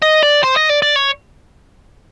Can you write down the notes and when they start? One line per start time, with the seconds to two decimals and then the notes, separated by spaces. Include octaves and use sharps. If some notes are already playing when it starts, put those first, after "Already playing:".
0.02 D#5
0.22 D5
0.43 C5
0.56 D#5
0.69 D5
0.82 D5
0.96 C#5